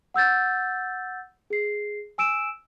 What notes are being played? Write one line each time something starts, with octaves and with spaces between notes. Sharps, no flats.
F#5 E6 G6 A6
G#4 C7
G#5 E6 D7 E7